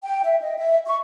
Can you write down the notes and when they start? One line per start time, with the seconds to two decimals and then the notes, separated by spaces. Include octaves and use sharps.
0.03 G5
0.24 E5
0.42 D#5
0.58 E5
0.87 C#6